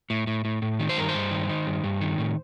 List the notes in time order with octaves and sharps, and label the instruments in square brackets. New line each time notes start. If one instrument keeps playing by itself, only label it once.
[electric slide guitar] A2
A2
A2
A2
D#3
C5
G2 A#4
C5
G2
D#3
D#3
G2
G2
D#3
A2